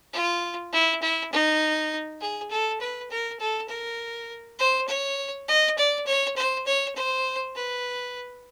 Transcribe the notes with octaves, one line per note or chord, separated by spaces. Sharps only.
F4
E4
E4
D#4
G#4
A4
B4
A#4
A4
A#4
C5
C#5
D#5
D5
C#5
C5
C#5
C5
B4